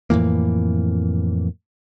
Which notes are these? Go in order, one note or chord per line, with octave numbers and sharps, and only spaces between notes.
F2 A2 E3 A#3